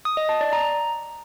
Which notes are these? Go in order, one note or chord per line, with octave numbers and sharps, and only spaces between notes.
D#6
D#5
A5
D5
A#5